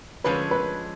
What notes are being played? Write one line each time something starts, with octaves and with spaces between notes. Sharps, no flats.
D3 F3 G#3 C#4 B4
B4